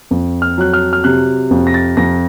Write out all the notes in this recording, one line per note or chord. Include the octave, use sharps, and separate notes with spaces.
F2
F6
F#3 F#6
F6
F6
C3 F#6
F2
A#6
A6
F2 A#6